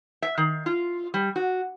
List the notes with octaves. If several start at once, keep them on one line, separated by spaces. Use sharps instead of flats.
E5
D#3
F4
G3
F#4